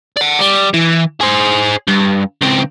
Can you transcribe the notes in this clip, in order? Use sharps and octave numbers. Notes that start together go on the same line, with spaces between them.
D5 F#5
G3
E3
G#4 C5
G2
C#2 C4